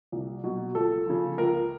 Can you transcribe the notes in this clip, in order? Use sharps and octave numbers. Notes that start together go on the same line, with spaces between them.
C2
B2 F#3
C#2 A4
C#3 F3
C#2 A#4